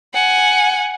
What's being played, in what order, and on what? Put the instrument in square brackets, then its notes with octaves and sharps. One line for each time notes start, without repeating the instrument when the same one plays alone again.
[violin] F#5 G#5